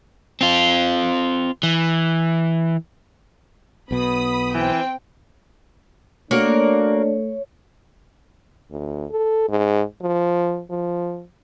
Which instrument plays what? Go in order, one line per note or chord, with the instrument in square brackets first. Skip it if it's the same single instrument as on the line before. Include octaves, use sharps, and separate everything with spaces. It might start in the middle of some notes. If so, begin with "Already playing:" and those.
[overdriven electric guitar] C4 F4
E3
[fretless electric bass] B1 B2 [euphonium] B3 [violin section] B5 D#6
[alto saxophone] E3 [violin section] C4 G5
[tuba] A3 [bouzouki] A#3 F#4 A#4 [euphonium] D4 [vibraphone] C#5
[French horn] D2
A4
G#2
F3
F3